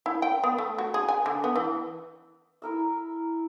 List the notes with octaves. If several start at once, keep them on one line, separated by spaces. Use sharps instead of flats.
E4
G5
B3
A3
F#4
G#4
G#5
D3
B3
E3
E4 A#4 E5